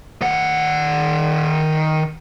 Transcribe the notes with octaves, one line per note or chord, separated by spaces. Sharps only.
D#3 F#5